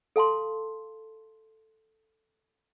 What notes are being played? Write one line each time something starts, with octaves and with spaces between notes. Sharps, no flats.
A4 F5 A5 C6